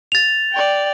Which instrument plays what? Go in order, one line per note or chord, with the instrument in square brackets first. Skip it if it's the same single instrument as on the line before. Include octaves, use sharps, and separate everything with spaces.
[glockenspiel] A6 F7
[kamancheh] D5 G5